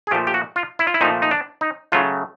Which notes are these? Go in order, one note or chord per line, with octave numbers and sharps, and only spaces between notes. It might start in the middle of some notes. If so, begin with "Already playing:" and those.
G#4
A#2 F3 A3 G4
G4
F#4
F4
E4
F4
E4
A#2 F3 A3 D#4
D#4
D4
D#4
C#3 F#3 A3 F4